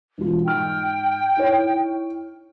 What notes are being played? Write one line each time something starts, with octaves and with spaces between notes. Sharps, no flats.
E1 F4
G#2 G5 F6
D#4 E4 C#5